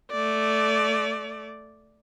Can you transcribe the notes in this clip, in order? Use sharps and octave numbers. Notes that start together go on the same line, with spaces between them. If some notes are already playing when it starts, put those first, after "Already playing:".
A3 D5